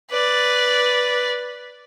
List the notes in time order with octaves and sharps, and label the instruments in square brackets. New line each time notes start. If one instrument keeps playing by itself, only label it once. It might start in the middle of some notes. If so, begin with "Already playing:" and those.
[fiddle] B4 D5